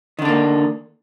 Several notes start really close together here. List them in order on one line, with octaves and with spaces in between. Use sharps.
D#3 D3 D4 A#3